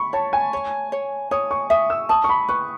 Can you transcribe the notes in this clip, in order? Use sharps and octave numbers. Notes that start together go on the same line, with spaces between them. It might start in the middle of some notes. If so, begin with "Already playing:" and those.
Already playing: B5 C#6
C#5 A5
G#5
C#5
C#5
C#5 D#6
C#6
E5 D#6
E6
A5 D#6
C#6
B5
B4 C#6